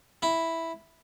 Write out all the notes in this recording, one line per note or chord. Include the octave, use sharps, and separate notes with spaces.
E4